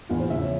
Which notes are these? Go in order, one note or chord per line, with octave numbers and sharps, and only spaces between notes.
E2 F4
C5
C#3 F3 E5
C#5